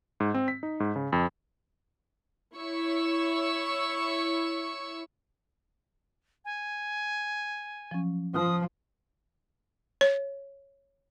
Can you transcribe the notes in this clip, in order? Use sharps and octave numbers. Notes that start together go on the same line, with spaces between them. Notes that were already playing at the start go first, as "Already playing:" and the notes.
G#2
C4
B6
D#4
G#2
C#3
F2
E4 C#5 C#6 E6
G#5
F3 F#3 C#4
F3 F4 D#6
C#5